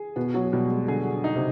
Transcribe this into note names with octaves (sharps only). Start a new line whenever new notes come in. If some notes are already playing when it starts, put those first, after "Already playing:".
Already playing: G#4
B2 B3
F#3
B2 G3
G#3
D3 G#4
D3
D#4
C3